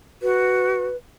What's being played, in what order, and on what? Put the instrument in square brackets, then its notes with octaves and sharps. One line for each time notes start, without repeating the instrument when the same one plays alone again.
[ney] F#4 [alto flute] B4